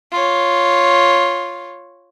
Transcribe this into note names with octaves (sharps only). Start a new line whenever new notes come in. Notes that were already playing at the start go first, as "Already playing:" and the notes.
F4 C#5